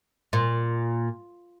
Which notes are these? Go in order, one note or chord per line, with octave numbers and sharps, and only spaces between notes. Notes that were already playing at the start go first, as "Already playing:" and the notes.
A#2